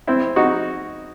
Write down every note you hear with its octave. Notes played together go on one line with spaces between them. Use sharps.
C4 E4
D#4 F#4